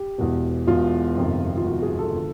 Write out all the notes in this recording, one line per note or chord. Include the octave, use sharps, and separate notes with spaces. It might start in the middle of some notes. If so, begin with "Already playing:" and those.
Already playing: G4
E1 E2 B2
E1 E2 B2 F4
G1 F2 C3 D#3
F4
G1 F2 C3 D#3 F#4
G#4
A4
D3 F3